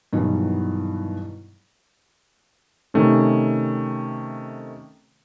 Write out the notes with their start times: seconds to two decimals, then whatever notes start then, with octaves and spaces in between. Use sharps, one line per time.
0.13 G2 B2 D#3 E3 F#3
2.94 C3 D#3 A3 C#4